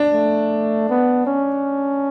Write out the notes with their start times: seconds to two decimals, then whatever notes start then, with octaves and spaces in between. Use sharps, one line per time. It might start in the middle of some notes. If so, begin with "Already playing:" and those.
Already playing: D4
0.13 A3
0.89 B3
1.27 C#4